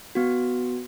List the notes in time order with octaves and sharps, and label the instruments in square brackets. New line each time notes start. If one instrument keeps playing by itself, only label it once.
[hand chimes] B3 F#4